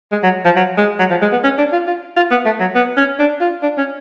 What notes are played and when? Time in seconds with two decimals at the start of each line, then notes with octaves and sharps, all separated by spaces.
0.12 G#3
0.23 F#3
0.45 F3
0.56 F#3
0.78 G#3
0.99 F#3
1.10 F3
1.22 G#3
1.33 B3
1.44 C#4
1.58 D4
1.73 F4
1.87 F4
2.17 F4
2.31 B3
2.46 A3
2.60 F#3
2.75 B3
2.97 C#4
3.19 D4
3.41 F4
3.63 D4
3.78 C#4